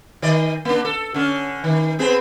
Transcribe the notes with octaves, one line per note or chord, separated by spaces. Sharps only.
D#3 D5 D#5
A#3 D4
A4
D3 C#4
D#3
B3 C4 G#4